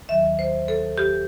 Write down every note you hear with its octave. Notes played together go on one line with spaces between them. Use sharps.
D#2 D#3 F#3 E5
C5
A4
G4